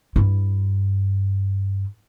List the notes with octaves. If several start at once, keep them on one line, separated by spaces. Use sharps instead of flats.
G2 E4